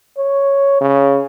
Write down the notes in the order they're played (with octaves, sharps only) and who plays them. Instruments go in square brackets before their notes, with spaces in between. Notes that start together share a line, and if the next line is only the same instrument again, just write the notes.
[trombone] C#5
C#3